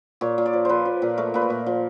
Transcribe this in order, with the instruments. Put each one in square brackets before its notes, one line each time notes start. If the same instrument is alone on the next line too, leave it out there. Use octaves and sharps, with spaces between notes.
[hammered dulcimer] A#2 C#5
A#2
D5
F3
F3 B4 C5
F3
A#2
A3 A#4
A#2 B4
A#4
A#2
F3